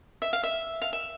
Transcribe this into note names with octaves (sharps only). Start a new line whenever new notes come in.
E5
F5
E5
F5
E5